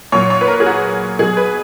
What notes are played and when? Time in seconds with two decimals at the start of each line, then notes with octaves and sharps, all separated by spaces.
0.12 A#2 F#3 C#5
0.30 C#5
0.41 B4
0.48 A#4
0.60 G#4
0.66 F#4
1.19 B2 F#3 G#4
1.37 B4